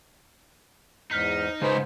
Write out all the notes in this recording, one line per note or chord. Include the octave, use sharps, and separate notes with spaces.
E2 G#2 D#4 F6 B6
G#2 C#3 D#4 B4 C5